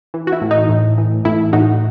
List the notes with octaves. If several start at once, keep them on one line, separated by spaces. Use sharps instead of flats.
E3
F#4
E4
A2
D#4
A2
E3
A2 E4
A2 D#4 F#4